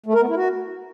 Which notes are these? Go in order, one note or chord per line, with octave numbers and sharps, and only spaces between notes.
A3
A#4
B3
E4
F#4